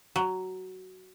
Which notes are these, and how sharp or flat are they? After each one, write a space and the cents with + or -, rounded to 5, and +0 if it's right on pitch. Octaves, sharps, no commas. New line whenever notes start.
F#3 +10